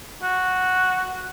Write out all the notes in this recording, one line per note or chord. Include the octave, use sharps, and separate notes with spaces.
F#4